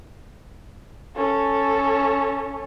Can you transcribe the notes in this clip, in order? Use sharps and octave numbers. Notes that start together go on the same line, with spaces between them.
C#4 A4